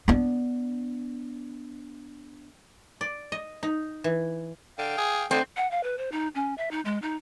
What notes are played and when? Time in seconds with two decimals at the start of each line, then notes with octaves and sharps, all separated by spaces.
0.08 B3 D4
3.01 D5
3.32 D#5
3.63 D#4
4.04 E3
4.78 D3 F5 G5
4.97 G#4
5.31 D3 A3 C4 D#4
5.56 F#5
5.71 F5
5.83 B4
5.98 C5
6.12 D#4
6.35 C#4
6.58 E5
6.71 D#4
6.85 G#3
7.02 D#4